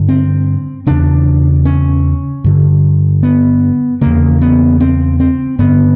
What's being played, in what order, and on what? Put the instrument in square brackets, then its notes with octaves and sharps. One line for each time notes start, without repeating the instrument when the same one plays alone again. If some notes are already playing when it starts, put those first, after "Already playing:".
Already playing: [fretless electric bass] G2 D3
C4
E2 C#3 D4
C#4
G2 D3
B3
E2 C#3 A#3
B3
C4
C4
G2 D3 B3